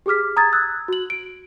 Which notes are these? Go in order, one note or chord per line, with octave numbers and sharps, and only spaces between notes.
G4 G#4 D6 F6 B6
A#5 D#6 G#6 A6
E6 F#6 G#6
F#4 F#7
D7